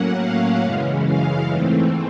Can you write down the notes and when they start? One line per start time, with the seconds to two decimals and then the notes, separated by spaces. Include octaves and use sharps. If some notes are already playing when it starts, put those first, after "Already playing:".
Already playing: A2 F#3 A#3 C#4 F#5
0.19 F5
0.63 F#2 C#3 E3 G#3 C#4
1.05 F5
1.48 G#2 E3 A3 C4